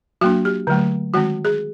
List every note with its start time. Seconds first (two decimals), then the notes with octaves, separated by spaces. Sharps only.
0.21 F#3 A#3 D4 F#4
0.45 G4
0.67 D3 F#3 A3
1.14 D#3 G#3 C4 F#4
1.45 G#4